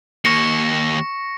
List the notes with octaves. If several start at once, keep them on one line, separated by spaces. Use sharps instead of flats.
D#2 A#3 C#6 A#6 C#7